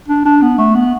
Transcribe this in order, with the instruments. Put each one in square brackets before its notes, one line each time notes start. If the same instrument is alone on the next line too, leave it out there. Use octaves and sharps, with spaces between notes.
[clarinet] D4
D4
B3
A3
B3